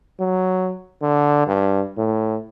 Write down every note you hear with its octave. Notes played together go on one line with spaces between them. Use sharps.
F#3
D3
G2
A2